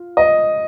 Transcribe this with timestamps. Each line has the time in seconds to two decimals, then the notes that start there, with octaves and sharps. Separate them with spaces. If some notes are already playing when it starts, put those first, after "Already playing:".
Already playing: F4
0.17 D#5